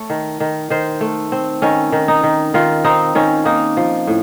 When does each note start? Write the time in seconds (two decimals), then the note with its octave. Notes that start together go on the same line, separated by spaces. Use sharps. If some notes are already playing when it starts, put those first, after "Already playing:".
Already playing: A3 C#5
0.10 D#3
0.40 D#3
0.70 D#3 C5
1.01 A3
1.32 C4
1.62 D#3 C#4
1.92 D#3
2.08 D#4
2.23 D#3
2.54 D#3 F4
2.84 C4 D#4
3.15 D#3 C#4
3.45 A#3 D#4
3.77 F3
4.07 A2